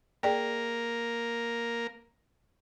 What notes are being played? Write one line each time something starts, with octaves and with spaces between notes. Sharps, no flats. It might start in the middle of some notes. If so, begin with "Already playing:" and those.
A#3 G#4 A#4 D5 G5